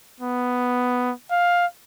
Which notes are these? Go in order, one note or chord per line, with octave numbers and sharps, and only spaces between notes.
B3
F5